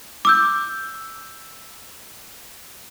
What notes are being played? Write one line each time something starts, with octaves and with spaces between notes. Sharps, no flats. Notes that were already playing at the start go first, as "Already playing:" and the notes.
D6 E6 G6